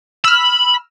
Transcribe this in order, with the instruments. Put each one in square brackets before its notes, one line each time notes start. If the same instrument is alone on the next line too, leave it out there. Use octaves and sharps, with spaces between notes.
[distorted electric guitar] B5 [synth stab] E6 F6